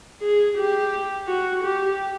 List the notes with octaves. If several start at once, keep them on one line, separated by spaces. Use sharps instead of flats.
G#4
G4
F#4
G4